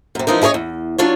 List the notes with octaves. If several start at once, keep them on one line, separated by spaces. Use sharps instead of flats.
F#2 C3
E3 F3 G#3 D#4 A#4
E4 G#4 A4 C#5 D#5
E2
F#3 D4 F4 C#5